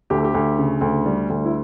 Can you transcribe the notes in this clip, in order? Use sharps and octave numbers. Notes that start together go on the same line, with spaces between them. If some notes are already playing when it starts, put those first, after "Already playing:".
D2 G4
A4
G4
D2
C#3
D2
G3
D2
E4